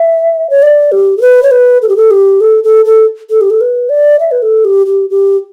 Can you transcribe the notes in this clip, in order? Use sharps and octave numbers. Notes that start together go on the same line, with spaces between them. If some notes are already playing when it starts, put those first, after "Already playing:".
Already playing: E5
C#5
D5
G4
A4
B4
C#5
B4
A4
G4
A4
G4
A4
A4
A4
A4
G4
A4
B4
D5
E5
B4
A4
G4
G4
G4